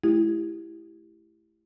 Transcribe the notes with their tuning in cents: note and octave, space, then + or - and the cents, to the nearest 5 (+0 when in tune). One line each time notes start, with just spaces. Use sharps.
A3 -35 E4 +5 G4 +0